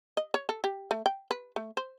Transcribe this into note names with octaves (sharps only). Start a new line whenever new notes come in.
D#5
C#5
A4
G4
A3
G5
B4
A3
C5